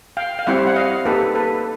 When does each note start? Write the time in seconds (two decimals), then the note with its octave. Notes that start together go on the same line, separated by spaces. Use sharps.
0.17 F5 G5
0.39 F5
0.47 G3 C4 E4 G4 E5 F#5
0.67 F#5
0.76 D#5 F5
1.05 A#3 D#4 G4 A4 B4
1.35 A4 B4